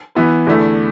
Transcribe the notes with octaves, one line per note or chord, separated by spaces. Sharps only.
E3 B3 E4 B4
E2 D3 A3 E4